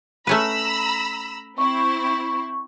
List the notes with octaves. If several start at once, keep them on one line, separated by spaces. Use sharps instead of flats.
A3 C#4 B4 A#5 B5 E6
C4 E4 C#6